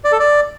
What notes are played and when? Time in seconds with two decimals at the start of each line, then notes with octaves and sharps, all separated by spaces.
0.04 D5
0.12 A4
0.20 D5